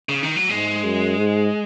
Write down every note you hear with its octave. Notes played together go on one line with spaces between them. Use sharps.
C#3
D#3
F#3
G#2 G#3
F#2
G#2